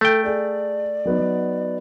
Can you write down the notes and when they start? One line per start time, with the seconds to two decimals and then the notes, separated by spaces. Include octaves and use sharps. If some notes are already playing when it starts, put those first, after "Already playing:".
0.01 A3 A4 G5
0.24 G#4 A4 D5
1.05 F#3 B3 D#4